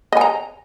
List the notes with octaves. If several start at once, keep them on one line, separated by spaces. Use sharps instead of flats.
D#5 G#5 A#5